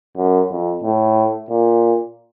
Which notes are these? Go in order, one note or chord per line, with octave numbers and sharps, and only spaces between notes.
F#2
F2
A2
A#2